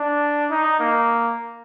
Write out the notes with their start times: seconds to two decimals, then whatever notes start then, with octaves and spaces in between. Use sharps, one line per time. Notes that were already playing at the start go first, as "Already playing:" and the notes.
Already playing: D4
0.51 D#4
0.80 A#3